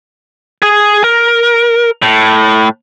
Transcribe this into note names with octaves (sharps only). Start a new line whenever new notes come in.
G#4 G#5
A#4
A2